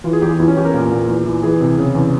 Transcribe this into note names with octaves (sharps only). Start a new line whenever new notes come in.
E3 F4
G#4
E2 G4
F4
E2 E4
C#4
E2 G4
A#4
A#2
A#2
E2
E3
E3 G#4
C3
C#3
E2